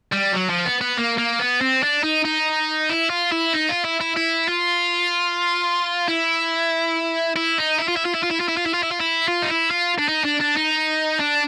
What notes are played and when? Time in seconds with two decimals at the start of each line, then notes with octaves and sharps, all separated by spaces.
0.12 G3
0.33 F#3
0.49 F3
0.65 B3
0.81 B3
0.97 A#3
1.18 A#3
1.39 B3
1.61 C4
1.83 D4
2.04 D#4
2.25 D#4
2.89 E4
3.10 F4
3.32 E4
3.53 D#4
3.69 F4
3.85 E4
4.01 E4
4.17 E4
4.49 F4
6.08 E4
7.36 E4
7.58 D#4
7.79 E4
7.88 F4
7.96 E4
8.05 F4
8.14 E4
8.23 F4
8.30 E4
8.40 F4
8.48 E4
8.57 F4
8.66 E4
8.74 F4
8.83 E4
8.91 F4
9.00 E4
9.28 F4
9.42 D#4
9.50 E4
9.71 F4
9.99 D4
10.08 D#4
10.24 D4
10.40 D4
10.56 D#4
11.21 D4